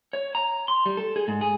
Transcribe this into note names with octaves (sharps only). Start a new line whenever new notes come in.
C#5
A#5
C6
G3
A4
G#4
G#2
G#4